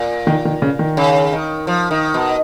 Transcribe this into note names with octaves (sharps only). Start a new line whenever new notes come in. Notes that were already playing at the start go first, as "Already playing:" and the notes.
Already playing: A#2
D#3
D#3
C#3
D#3
C#3
D#3
F3
D#3
B2